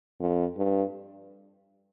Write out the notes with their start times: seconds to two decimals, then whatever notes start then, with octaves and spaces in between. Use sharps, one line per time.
0.20 F2
0.57 G2